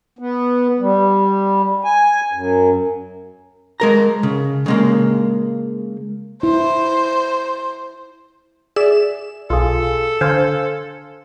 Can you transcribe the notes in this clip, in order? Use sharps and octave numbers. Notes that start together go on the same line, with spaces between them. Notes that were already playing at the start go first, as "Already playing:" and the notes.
B3
G3
G#5
F#2
G#3 A#4 A#5
C#3
C#3 G#3 A#3
E4 C5
G#4 D5 E5 E7
B1 F4 G#4 A4
D3 C5 F5 G#5